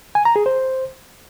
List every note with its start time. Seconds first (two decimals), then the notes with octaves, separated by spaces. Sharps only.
0.15 G#5
0.25 A#5
0.36 G#4
0.46 C5